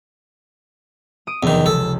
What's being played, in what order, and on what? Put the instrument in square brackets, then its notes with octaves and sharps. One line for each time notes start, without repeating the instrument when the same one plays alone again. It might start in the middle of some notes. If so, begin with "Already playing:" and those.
[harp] D#6 D7 D#7
[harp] F1 [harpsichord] E2 D#3
[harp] C#2 [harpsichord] A4